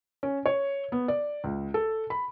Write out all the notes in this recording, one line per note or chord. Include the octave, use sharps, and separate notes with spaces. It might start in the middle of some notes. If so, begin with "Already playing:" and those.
C#4
C#5
B3
D5
C#2
A4
B5